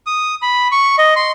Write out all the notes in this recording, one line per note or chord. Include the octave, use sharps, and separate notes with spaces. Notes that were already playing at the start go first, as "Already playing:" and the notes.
D#6
B5
C#6
D#5
C6